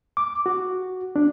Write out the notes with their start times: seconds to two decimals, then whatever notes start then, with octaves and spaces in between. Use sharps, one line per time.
0.17 D6
0.46 F#4
1.16 D4